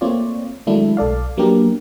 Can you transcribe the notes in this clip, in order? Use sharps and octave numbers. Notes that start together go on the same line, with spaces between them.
A3 A#3 C4 F4 C#5 D5
D#3 F#3 G#3 A3 D4 E4
B1 A4 D5 F5
F#3 A#3 B3 D4 G4 A#4